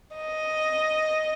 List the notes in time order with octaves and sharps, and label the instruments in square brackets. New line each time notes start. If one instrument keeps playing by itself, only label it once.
[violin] D#5